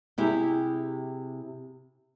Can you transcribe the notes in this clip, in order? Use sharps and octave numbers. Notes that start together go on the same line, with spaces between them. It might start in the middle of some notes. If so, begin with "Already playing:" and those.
C3 E4 G4 G#4